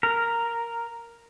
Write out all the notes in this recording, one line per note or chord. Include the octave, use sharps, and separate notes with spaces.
A#4